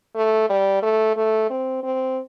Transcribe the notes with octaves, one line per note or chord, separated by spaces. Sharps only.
A3
G3
A3
A3
C4
C4